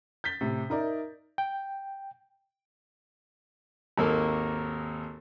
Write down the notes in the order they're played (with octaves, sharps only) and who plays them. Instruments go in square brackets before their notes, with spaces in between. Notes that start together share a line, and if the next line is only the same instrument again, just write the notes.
[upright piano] G6 A6 B6 G7
A2 C3
D#4 A#4 D5 E5
[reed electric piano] G5
[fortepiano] G#1 D#2 A#3 A4 A#4